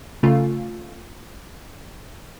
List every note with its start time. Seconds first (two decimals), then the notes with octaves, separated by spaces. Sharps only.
0.23 C#3 A3 F4